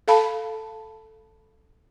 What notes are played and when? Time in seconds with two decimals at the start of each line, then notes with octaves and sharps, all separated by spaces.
0.08 A4 F5 A5 B5